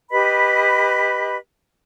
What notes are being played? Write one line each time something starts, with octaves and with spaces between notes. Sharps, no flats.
G4 B4 D#5 B5